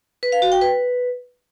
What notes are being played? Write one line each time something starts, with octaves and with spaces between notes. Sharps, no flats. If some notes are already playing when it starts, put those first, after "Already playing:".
B4
F5
F#4
G5
B4